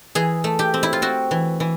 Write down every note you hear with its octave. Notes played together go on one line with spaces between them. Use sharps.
E3 G#4
A3
G4
C4
E4
F4
C4 F#4
E3
E3